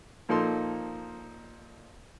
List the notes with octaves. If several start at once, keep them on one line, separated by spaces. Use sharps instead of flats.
A#2 F3 A#3 D#4 A4 C6